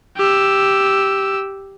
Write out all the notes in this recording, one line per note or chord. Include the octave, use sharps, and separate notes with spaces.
G4 E6